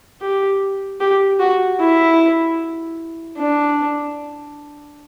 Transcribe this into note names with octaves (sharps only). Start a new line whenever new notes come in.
G4
G4
F#4
E4
D4